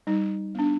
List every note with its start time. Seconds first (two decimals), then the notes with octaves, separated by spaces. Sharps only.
0.07 G3 D#4
0.55 B3 D4